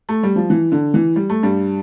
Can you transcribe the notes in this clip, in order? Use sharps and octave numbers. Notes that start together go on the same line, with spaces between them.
A3
G3
F3
E3
D3
E3
G3
A3
G2 G3